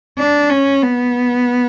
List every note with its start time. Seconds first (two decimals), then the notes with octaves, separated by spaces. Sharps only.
0.18 D4
0.50 C#4
0.83 B3